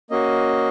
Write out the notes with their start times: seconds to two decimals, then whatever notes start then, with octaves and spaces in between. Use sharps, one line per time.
0.10 A#3 C#4 F#4 D#5